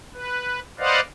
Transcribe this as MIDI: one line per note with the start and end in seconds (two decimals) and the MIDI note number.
0.15 0.60 71
0.79 1.00 71
0.79 1.00 72
0.79 1.00 74
0.79 1.00 75
0.79 1.00 77
0.79 1.00 78